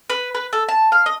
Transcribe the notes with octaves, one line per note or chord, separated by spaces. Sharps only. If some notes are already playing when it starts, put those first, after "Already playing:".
B4
B4
A4
A5
F5
D#5